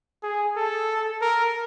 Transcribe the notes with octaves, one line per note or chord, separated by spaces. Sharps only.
G#4
A4
A#4